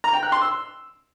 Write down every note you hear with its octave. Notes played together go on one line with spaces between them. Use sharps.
A#5
G5
F#6
C6
E6